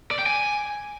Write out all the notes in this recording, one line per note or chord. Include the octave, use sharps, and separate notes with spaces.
D5
G5
G#5